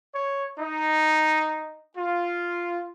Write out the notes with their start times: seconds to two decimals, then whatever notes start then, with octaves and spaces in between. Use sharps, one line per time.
0.14 C#5
0.59 D#4
1.95 F4